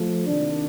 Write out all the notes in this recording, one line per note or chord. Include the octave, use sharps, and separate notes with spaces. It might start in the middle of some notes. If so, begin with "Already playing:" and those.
Already playing: F3 A3
C3 D#3 A#3 D4